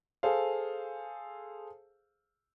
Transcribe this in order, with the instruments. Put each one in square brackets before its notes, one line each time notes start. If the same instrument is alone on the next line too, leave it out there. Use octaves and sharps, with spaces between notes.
[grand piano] G#4 A4 C5 F5